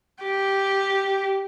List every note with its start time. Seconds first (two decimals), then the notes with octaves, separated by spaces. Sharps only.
0.24 G4